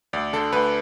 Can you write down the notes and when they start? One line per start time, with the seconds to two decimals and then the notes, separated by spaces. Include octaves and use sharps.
0.13 D2 D5
0.33 D3 A4
0.52 D2 B4